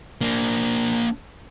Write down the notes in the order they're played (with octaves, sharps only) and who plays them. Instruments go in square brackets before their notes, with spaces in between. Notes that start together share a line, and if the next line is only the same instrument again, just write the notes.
[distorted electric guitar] A#3 D4